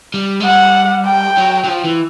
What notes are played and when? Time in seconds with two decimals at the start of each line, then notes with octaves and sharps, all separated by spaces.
0.14 G3
0.40 G#3
0.44 G3 F#5
1.06 G5
1.38 F#3
1.64 F#3
1.68 F3
1.84 E3